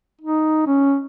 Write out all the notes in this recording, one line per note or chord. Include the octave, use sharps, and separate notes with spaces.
D#4
C#4